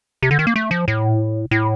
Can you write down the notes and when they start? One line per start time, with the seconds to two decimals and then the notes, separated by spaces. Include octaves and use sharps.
0.22 C3
0.31 D3
0.39 D#3
0.47 A#3
0.56 A3
0.71 F3
0.88 A2
1.51 A2